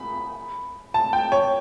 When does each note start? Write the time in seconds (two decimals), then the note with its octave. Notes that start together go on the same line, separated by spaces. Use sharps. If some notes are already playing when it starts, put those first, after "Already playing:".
Already playing: B5
0.94 A5
1.13 G5
1.32 C#5